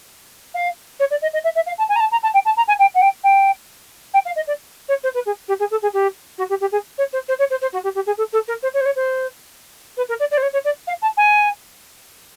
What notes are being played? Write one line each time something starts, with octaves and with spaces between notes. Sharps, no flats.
F5
C#5
D5
D#5
D#5
E5
E5
F5
A5
G#5
A#5
A5
A#5
A5
G5
A5
A#5
G#5
G5
F#5
G5
G5
G5
F5
D#5
D5
C#5
C5
B4
G#4
G4
G#4
A4
G#4
G4
F#4
G4
G4
G#4
C#5
C5
C5
C#5
C5
C5
F#4
G4
G4
G#4
A4
A4
A#4
C5
C#5
C5
C#5
C5
B4
A#4
D5
D5
C5
C#5
C#5
D5
F5
A5
G#5